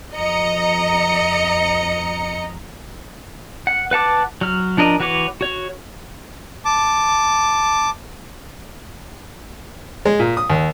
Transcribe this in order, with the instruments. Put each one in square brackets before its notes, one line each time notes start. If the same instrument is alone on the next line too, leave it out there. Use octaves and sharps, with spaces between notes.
[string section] F2 D#5 A#5 C#7
[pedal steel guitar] F#5
B4 F#5 A5 D6
F#3 F6
F3 D4 A#4 D#5
E3 F#4 B4 C#5 D6
F#4 C#5
[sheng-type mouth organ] A5 D6
[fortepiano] G#3
A#2
D#6
D#2